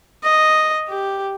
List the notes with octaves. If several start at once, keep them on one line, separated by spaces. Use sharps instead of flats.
D#5
G4